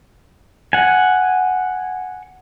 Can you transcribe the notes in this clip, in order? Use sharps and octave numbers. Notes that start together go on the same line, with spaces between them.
F#5 G#5